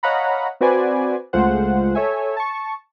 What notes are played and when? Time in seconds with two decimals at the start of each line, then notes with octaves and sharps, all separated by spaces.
0.03 C#5 D#5 F5 F#5 A#5 B5
0.61 C4 F#4 B4 C5 D5 G#5
1.33 C#2 G#3 A3 F4 C5 F#5
1.95 A4 C#5 E5 G#5
2.37 A5 C#6